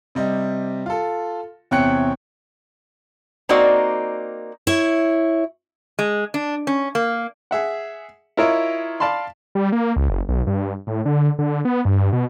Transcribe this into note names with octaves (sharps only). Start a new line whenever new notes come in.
C3 G3 D#5
F4 A4
E2 C3 C#5 G5 F#6 C#7
A#3 C4 D#4 F#4 D5
E4 C#5
G#3
D4
C#4
A#3
G#4 E5 F#5
E4 F4 A#4 C#5 D#5 E5
D5 F5 A5 B5 C6
G3
A#3
C#2
F#1
B1
G2
A2
D3
D3
B3
G2
B2